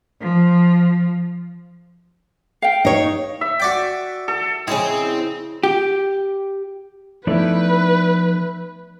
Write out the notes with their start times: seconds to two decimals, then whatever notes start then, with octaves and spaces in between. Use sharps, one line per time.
0.21 F3
2.62 F5 G5
2.85 D#4 C#5
3.41 E5
3.60 F#4 D5 G5
4.28 A4
4.68 C#3 C4 E4 G#4 D#5
5.63 G4
7.27 F3 A3 B3 D#4 E4 B4 D5